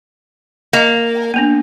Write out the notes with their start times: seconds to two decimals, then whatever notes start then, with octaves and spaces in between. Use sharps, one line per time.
0.73 A#3 D#5 F5
1.34 A#3 B3 D4